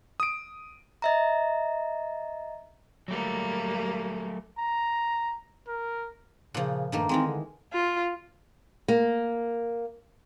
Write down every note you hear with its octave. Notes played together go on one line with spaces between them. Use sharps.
D#6 D7
D#5 E5 A#5
F#3 G3 A3 A#3
A#5
A#4
A#2 C#3 F3
G2 D#3 A3 A#3
D#3 E3 G#3 C4
D3
F4
A#3